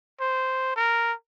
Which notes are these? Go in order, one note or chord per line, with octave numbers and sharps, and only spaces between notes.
C5
A#4